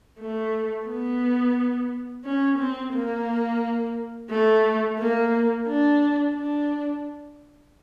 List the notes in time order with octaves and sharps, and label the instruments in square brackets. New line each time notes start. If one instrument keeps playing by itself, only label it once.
[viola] A3
B3
C#4
C4
A#3
A3
A#3
D4
D4